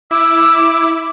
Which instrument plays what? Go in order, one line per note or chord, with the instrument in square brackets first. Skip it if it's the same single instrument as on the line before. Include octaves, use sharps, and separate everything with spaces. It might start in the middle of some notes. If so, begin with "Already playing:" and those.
[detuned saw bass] E4 [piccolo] D6 [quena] E6